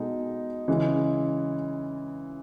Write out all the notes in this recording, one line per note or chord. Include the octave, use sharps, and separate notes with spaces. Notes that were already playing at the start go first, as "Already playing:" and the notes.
Already playing: B2 G#3 D#4 A4
C#3 E3 G#3